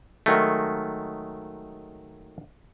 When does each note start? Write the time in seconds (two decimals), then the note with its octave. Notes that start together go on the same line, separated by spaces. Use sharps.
0.26 D#3 F#3 G#3 A3